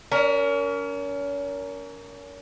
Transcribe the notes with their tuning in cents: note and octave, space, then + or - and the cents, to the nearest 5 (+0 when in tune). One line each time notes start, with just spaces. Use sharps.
C#4 +35 A#4 +0